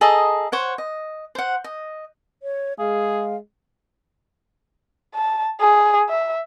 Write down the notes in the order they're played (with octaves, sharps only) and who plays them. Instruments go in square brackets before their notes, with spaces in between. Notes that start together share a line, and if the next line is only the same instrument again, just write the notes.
[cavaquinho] G#4 A4 D#5 A#5
C5 C#5 F#5
D#5
C5 F#5
D#5
[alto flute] C#5
[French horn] G#3 [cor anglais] G#4 [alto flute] F5
[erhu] A5
G#4
E5